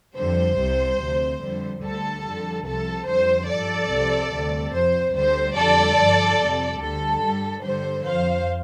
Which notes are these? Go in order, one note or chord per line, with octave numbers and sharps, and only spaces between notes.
F2 D3 G3 C5
C2 C3 G3
D2 C3 F3
F2 D3 G3
D2 D3 G3 A4
F2 D3 G3
C2 C3 F3 A4
F2 D3 G3 C5
G2 F3 A4 D5
C2 C3 F3
D2 C3 G3
F2 F3 C5
D2 D3 G3 C5
F2 D3 G3 A4 D5
G2 F3
F2 C3 G3
D2 D3 G3 A4
G2
G3
G2 D3 G3 C5
F2 F3 C5 F5